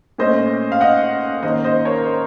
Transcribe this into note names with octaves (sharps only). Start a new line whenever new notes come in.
A#2 A3 C#4 C5 D#5
F5
D#5 F#5
D#3 A#3 C#4 C5 D#5
C5 D#5
A#4 C#5
C5